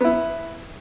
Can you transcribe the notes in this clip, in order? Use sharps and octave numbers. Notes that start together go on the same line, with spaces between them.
B3 E4